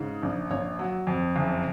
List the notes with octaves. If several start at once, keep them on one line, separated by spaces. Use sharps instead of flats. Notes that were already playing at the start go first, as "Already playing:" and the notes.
Already playing: G#2 C#3
A#1
A#1 C#5
F#3
F2
F#1